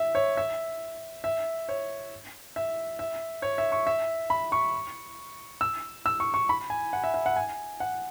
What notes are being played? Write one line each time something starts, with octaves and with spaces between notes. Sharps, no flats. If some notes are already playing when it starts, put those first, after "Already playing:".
Already playing: E5
C#5
E5
E5
C#5
E5
E5
C#5
E5
C#6
E5
B5
C#6
E6
E6
C#6
C#6
B5
G#5
F#5
E5
E5
F#5
G#5
F#5